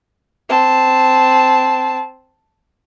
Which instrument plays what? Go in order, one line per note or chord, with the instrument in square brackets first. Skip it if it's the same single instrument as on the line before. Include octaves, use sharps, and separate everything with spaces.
[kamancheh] C4 A5